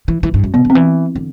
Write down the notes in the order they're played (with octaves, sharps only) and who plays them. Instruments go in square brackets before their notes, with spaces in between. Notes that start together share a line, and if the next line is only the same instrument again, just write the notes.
[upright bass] E3
E3
G2
F#2
[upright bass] C3 [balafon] B3
[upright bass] D3
[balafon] C4
[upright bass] E3
D3